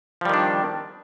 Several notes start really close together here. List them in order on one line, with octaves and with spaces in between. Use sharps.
F3 G3 D#3 D4